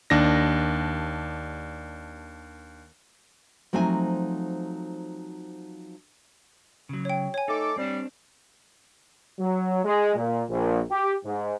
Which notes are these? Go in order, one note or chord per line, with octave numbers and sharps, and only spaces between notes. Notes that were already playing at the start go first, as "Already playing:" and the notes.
D#2 D4 A#6
F3 F#3 A3 C4 D#4 G#5
C#3 F#3
C#5 G5
C#5 G#5
A3 D#4 A4 D6
G3 C4 D4
F#3
G#3
A#2
A#1
G4
G#2